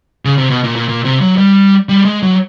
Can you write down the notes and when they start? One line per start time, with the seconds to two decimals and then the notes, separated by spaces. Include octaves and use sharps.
0.25 C#3
0.38 C3
0.50 B2
0.64 A#2
0.76 A#2
0.89 A#2
1.05 C3
1.21 F#3
1.38 G3
1.89 G3
2.05 G#3
2.23 F#3